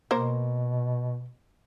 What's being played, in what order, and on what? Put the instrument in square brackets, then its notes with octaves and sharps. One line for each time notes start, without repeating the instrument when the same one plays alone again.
[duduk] B2 [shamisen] A#3 A#4 C5